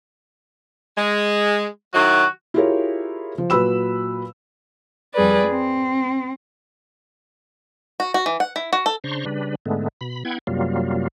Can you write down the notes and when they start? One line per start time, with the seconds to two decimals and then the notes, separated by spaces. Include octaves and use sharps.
0.98 G#3
1.94 D#3 F#3 E4 F#4
2.54 E4 F4 G4 G#4 A#4 C#5
3.38 F3
3.50 A#2 F#3 B4 B5 E6 E7
5.14 F2 G3 G#4 B4 D5
5.48 C4
8.00 F#4
8.14 F#4
8.26 E3
8.40 F#5
8.56 E4
8.73 F#4
8.86 A4
9.04 C#3 D4 C5 A#5 C6 C#6
9.25 C#3 G3 D4 B4
9.66 G#2 D3 G#3 A3 B3
10.01 B2 B5
10.25 B3 E4 F#5 G5 G#6
10.47 F#2 C3 F#3 G3 A#3 F4